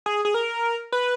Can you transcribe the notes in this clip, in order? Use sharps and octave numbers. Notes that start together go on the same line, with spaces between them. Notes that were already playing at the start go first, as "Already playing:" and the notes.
G#4
G#4
A#4
B4